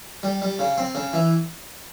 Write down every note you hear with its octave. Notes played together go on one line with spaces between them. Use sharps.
G3
G3
C#3
C4
C#3
E3